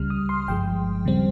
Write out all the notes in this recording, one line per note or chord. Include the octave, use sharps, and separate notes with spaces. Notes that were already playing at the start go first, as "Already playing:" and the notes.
Already playing: C#2 C#3 G3 F6
D#6
C6
G1 G2 F3 G#3 G5
D#2 C#3 G3 C4